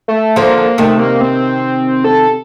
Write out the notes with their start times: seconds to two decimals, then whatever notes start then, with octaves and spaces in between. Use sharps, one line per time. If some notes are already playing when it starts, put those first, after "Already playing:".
0.08 A3
0.36 D3 F3 A#3
0.57 A#3
0.78 C3 D#3 A3
0.99 A#3
1.21 C4
2.04 A4